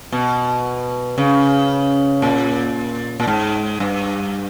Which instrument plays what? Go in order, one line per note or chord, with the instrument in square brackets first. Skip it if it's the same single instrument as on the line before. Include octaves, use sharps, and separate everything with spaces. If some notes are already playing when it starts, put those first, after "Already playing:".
[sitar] B2
C#3
A#2
A#2
G#2
G2